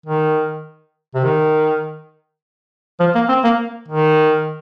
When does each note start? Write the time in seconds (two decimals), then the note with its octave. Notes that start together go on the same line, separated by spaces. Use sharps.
0.06 D#3
1.15 C3
1.24 D#3
3.00 F3
3.15 A#3
3.29 C4
3.44 A#3
3.88 D#3